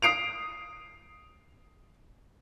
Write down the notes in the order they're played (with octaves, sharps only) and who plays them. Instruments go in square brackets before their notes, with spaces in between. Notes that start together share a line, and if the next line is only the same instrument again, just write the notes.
[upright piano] D#6 C7 D7 F7